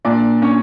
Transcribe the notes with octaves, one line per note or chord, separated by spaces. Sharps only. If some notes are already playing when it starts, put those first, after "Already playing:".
A#2 D4 D5
C#4 C#5